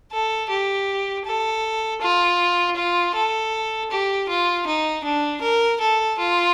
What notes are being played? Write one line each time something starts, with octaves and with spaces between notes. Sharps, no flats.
A4
G4
A4
F4
F4
A4
G4
F4
D#4
D4
A#4
A4
F4